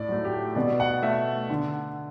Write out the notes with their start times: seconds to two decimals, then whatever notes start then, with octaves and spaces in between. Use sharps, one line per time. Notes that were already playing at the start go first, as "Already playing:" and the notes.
Already playing: A2 D5
0.09 F#3 A3
0.25 G4
0.55 B2 D5
0.80 F#5
1.02 A3 E5
1.50 D3